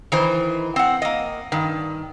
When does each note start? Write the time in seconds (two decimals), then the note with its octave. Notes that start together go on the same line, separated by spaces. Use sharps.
0.12 D#3 E3 C5
0.76 C4 F#5
1.02 A#3 D#5
1.52 G2 D#3